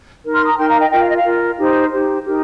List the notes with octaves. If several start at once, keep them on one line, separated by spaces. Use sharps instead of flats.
D#4 A#4
C6 F6
A#5 D#6
D#4 A#4 G5 C6
F5 A#5
D#5 G5
F4 A#4 D#5 G5
F5
D#5
F5
F4 A#4
D#4 G4 C5
D#4 G4 C5
D#4 G4 A#4